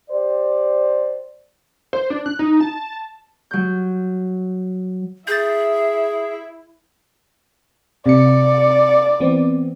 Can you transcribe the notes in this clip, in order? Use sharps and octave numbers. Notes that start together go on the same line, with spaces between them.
G4 C5 D5
C5
D4
F#6
D#4
A5
F#3 G6
E4 G#4 E5 G6 A6
C3 D5 C#7
E3 B3 C4